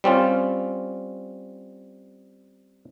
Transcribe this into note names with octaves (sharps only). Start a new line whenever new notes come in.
G3 C4 C#4 F4